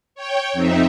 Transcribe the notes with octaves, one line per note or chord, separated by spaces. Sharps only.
C#5 G5
F2 C4 D#4 E5